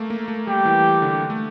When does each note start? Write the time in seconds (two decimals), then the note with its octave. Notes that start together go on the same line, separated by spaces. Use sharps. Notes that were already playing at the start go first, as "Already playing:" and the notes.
Already playing: A3 A#3
0.10 A#3
0.28 A3
0.47 G3 G4
0.65 E3
1.02 D3
1.30 A3